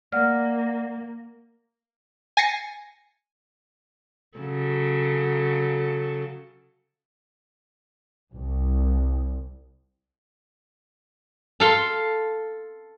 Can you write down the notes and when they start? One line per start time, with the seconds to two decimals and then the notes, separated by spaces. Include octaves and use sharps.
0.12 A#3 D5 F#5 F6
2.37 G#5 A6 A#6 C7 C#7
4.38 C#3 F#3 A4
8.34 C2
11.60 A4 F5 C6